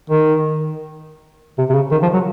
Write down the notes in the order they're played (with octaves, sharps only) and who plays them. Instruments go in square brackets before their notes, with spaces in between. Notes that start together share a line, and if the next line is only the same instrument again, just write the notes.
[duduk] D#3
C3
C3
C#3
D#3
F3
F#3